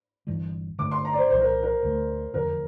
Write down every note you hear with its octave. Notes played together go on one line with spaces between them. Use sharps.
G1 G2 E3 G3
G1 G2 D3 A3 D6
C6
A#5
D5
C5
C2 A#2 F3 C5
A#4
A#4
D2 D3 A3
F1 E2 D3 F3 A#4